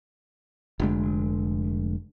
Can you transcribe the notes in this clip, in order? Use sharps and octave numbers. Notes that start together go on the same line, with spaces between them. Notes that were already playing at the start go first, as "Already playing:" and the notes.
F1 D3 G#3